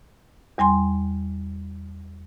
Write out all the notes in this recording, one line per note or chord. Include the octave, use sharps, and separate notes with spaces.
E2 G3 G#5 C6